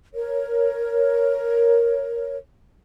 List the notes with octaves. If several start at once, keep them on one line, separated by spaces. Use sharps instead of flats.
A#4 C#5